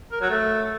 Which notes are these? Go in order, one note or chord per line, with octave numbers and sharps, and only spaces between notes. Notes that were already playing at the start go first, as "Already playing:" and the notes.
A#4
F#3
A3